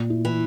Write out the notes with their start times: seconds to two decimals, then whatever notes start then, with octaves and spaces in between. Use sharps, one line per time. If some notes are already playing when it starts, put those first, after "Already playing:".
Already playing: A#2
0.10 E4
0.25 E3